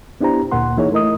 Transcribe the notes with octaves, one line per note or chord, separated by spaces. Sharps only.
B3 D4 E4 G4 C5 A#5
D2 A#2 A#3 F#5 C6
E3 A#3 D#4 E4 G#4 C#5
A3 E4 A#4 D#5 D#6